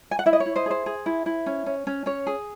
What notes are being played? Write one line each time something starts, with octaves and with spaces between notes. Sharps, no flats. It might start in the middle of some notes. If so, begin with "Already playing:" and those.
G#5
F#5
E4 E5
D#5
C#5
E4
C5 D#5
G#4 C5
G#4
E4
E4
C#4
C#4
C#4
C#4 C#5
G#4